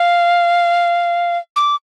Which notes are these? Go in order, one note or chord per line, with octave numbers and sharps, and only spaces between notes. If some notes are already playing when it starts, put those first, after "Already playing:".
Already playing: F5
D6